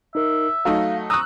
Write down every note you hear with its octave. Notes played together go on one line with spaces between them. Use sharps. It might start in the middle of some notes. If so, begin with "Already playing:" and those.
D#4 A#4 E5
F#3 A3 D#4 F5
A#5 C#6 D#6 E6 F#6